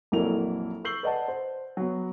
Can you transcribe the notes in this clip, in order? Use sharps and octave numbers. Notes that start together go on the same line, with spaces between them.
A#1 F2 F#3 E4 A#4 F7
C#6 E6 G6 C7 F#7 G7
B4 D5 D#5 F#5 A5
C5
F#3 B3